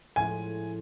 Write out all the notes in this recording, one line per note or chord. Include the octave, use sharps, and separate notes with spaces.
A2 F3 G#3 C#4 E4 G#5